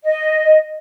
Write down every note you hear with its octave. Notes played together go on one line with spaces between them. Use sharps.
D#5